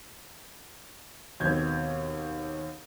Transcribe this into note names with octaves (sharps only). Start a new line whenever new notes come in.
D#2 B2 C4 G6 G#6